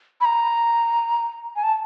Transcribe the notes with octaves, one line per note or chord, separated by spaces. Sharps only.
B5
A#5
G#5
A5